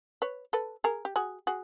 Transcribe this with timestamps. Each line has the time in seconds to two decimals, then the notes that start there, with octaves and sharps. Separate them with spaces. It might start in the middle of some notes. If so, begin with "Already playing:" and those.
0.22 B4 C#5
0.53 A4 B4
0.84 G#4 A#4
1.05 G4
1.16 F#4 G#4
1.47 F#4 G#4